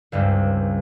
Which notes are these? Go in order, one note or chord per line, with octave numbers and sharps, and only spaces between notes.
C#2 G2 G3 G#3 C4